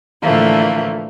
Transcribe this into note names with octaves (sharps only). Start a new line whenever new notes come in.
A2 D3 E3 F3 A3 A#3